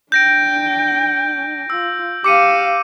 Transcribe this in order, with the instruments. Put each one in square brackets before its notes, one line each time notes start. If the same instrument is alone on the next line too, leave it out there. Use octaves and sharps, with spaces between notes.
[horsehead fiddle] D4 G5 [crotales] G6 A#6 D7
[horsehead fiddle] F4 [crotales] E6
[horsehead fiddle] G4 F5 [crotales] D6 C#7 D#7